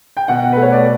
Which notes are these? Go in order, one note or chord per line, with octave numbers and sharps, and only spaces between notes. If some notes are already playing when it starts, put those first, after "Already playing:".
G5
B2 F#5
A3 B4
C#5
D5